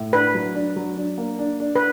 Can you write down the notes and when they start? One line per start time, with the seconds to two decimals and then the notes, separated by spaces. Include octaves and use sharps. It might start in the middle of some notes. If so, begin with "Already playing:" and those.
Already playing: A2
0.13 D4 B4
0.35 F#3
0.55 D4
0.76 F#3
0.97 D4
1.18 A#3
1.39 D4
1.60 D4
1.76 B4